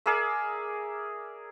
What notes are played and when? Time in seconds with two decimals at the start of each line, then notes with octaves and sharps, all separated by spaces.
0.06 G#4 A#4 D5 E5